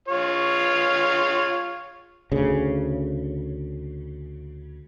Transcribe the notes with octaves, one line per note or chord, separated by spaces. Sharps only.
F4 C#5
D2 C#3